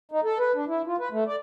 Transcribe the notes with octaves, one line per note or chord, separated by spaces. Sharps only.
D#4
A4
B4
D4
E4
F4
B4
A3
D5